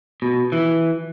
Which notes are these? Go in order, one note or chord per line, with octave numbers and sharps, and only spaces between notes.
B2
E3